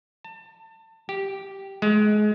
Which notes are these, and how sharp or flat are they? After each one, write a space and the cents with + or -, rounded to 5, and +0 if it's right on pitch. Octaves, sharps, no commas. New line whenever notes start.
A5 +30
G4 -5
G#3 +25